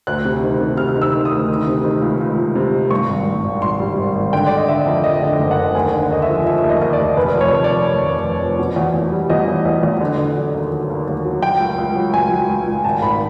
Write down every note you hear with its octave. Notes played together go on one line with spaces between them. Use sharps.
D2 F#6
C3
D#3
C3
C3 F6
D#3
E6
D#3
D#6
D2
D#3
C3
D#3
C#2
C#2
C#2
C3
D#3
G2 C#6
G#1
G2
G#1
G#1 C6
G3
G#1
G#1
D3 G5
D3 D5
D#5
D3 E5
F2
F2 D#5
D3
D#5
F#1
F#5
D3
D#2 G#5
D3
F#5
D#2 D#5
E5
F3
F3 E5
D#2
D#5
D#2
D5
D#2
F1 B4
F2
C#5
F1
D5
F2
F1
F1
F1
F2
B2
E2
E2
G3
E2 D#5
E2
E2
E2
D3
D3
F#3
D#2
F#3
D#2
D#2
F#3
F#3 G5
C#2
C#2
F#3
C#2 G#5
F#3
C#2
C#2
G#1 A5
G#1 B5